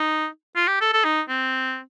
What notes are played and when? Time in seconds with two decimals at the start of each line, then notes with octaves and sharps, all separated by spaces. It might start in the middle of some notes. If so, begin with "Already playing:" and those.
Already playing: D#4
0.56 F4
0.68 G4
0.81 A4
0.93 A4
1.04 D#4
1.29 C4